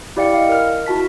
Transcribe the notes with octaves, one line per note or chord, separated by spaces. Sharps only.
E4 G4 D5 F5 G5 C#7
D#5 F5
A#4 F6
E4 F#4 A5 B6